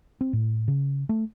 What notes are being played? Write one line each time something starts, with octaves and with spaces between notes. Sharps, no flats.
C4
A2
C#3
A3